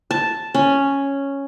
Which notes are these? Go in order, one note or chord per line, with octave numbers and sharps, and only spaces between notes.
A5
C#4